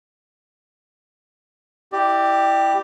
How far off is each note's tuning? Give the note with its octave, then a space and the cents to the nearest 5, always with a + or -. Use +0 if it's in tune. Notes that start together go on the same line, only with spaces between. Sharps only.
E4 +0 G4 +0 D5 +30